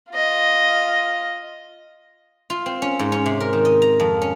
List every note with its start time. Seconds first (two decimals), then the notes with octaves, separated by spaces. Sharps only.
0.12 F4 D#5
2.50 F4
2.66 C4
2.82 C#4
2.99 G#2
3.12 C#4
3.26 C3
3.40 A#4
3.53 D#3
3.65 D#5
3.82 A#5
4.00 F2
4.22 C#4